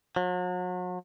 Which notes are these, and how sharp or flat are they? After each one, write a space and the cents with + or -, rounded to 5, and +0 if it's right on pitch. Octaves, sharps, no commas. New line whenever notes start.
F#3 -40